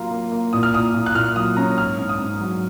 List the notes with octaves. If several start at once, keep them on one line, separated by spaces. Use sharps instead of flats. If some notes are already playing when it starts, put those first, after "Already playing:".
Already playing: F#3 A#3 F4 A#5
A#3
A#3
A#2 D#6
F6
A#2 D#6
A#2
F#6
A#2 F6
F#3 D#6
C#4 A#5
G#2 F6
G#2
D#6
G#2
F#3